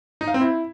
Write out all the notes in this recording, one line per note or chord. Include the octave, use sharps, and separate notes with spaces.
D#4
F5
C4
E4